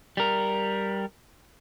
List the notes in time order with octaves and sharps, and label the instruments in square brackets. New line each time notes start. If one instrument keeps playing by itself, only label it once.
[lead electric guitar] G3 A#4